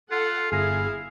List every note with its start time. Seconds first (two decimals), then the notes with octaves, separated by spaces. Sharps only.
0.11 F4 A4 F#5
0.52 G1 E4 G#4 F5 G#5 A#6